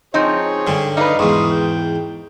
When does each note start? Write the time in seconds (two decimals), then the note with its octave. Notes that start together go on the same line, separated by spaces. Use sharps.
0.14 F3 C4 D#4 G#4 C#5
0.67 G2 D3
0.97 D#4 B4 D5 D#5 F5
1.19 E2 G#2 C6 C#6 D#6
1.51 G5